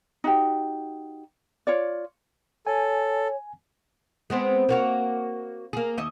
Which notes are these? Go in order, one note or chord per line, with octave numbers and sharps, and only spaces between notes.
D#4 F#4 G4
F4 C#5 D5
A4 C#5 G#5
G#3 B3 C4
A#3 F#4 C#5
A#3 G#4
D#2 D#5 E5